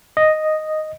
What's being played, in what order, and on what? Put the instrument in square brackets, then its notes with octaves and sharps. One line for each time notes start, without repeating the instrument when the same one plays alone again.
[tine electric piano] D#5